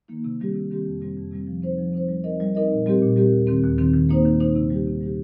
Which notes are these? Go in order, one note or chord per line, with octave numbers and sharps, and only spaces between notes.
D#3 A#3 D#4
C3
D#3 G3 C4 G4
C3
D#3 G3 C4 G4
F2
C3 G3 C4
F2
C3 G3 C4
F3
C4 D#4 C5
F3
C4 D#4 C5
G3
C4 D#4 A#4 D#5
G3
C4 D#4 A#4 D#5
A#2
G3 C4 G4 A#4
A#2
G3 C4 G4 A#4
D#2
D#3 C4
D#2
D#3 C4
D#3
A#3 D#4 C5
D#3
A#3 D#4 C5
C3
G3 D#4 G4
C3
G3 D#4 G4